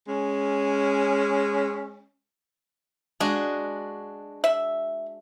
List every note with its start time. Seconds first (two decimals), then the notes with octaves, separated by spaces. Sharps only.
0.08 G#3 C#4
3.20 G#3 D4 F#4 G#4
4.44 E5